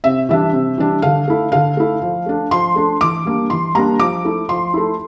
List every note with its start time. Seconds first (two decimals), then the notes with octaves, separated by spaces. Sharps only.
0.04 C3 E5
0.29 E3 G3 D4 E5
0.53 C3
0.78 E3 G3 D4
1.02 D3 F5
1.28 A3 E4
1.52 D3 F5
1.77 A3 E4
2.02 F3
2.26 A3 D4
2.51 F3 C6
2.76 A3 D4
3.01 E3 D6
3.25 G3 A#3 D4
3.50 E3 C6
3.75 G3 A#3 D4 A#5
3.99 F3 D6
4.25 A3 E4
4.49 F3 C6
4.74 A3 E4